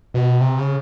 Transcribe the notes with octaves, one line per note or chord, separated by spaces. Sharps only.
B2
C3
C#3